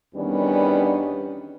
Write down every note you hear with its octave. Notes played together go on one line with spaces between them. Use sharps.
E2 D#3 G3 B3 C#4 D4